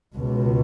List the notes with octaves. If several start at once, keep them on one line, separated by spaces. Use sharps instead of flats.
C#2 B2